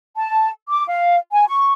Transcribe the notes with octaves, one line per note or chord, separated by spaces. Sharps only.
A5
D6
F5
G#5
C#6